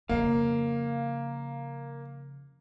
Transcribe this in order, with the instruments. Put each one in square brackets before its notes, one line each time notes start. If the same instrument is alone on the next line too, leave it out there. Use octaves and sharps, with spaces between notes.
[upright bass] F2 C#3 [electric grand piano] A#3 [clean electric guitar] F5